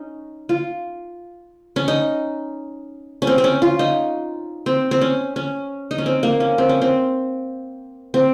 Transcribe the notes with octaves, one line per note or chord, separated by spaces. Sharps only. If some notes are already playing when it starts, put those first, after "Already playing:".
Already playing: C#4 D#4
F4
C#4
D#4
C#4
C4
C4
C#4
F4
D#4
C4
C4
C#4
C#4
D#4
C#4
C4
A#3
C#4
C4
C#4
C4
C4